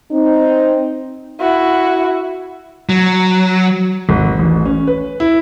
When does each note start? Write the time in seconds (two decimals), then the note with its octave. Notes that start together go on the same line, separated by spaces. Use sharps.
0.12 C4 D#4
1.40 E4 F#4
2.89 F#3
4.09 G#1
4.39 A1
4.65 C#4
4.87 B4
5.20 E4